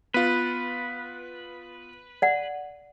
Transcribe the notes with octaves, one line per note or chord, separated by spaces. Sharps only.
B3 F4 B4
D5 F#5